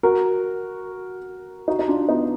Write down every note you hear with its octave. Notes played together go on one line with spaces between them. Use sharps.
F#4 A#4
D#4 F#4
D#4
D4 F4
B3 D#4